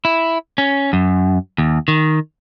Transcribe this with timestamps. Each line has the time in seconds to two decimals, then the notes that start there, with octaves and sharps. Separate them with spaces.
0.05 E4
0.58 C#4
0.93 F#2
1.58 D#2
1.88 D#3